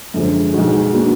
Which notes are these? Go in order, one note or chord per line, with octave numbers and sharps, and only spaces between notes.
F#2 D3 F3 G#3
B1 B2 G#3 D#4 F#4
B2 A#3 D4 F#4